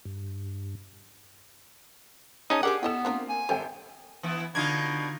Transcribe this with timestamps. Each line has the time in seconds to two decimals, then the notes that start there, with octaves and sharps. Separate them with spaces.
0.05 G2
2.50 C#4 D#4 G#4 C#5 A5 D#6
2.63 C4 D4 G4 G#4 A#4 F#5 G5
2.83 B3 E4 A4 D#5 G5 E7
3.05 A#3 C4 D4 F4 A#4
3.29 G#5
3.49 G#1 G4 A4 G5
4.23 E3 B3 E4
4.55 B2 D3 D4 D#4 F4 G#6